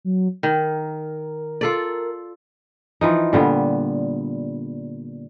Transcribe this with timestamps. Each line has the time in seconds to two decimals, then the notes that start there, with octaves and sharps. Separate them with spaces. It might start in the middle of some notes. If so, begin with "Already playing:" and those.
0.04 F#3
0.43 D#3 A#4
1.61 F4 A4 D5
3.01 E3 F3 D#4
3.33 A#2 D3 G3 B3